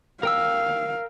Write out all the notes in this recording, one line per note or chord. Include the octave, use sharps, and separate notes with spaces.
A#4 F5 G5 E6